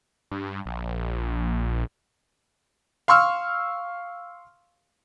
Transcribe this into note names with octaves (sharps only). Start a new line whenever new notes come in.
G2
A#1
F5 C6 C#6 E6 F6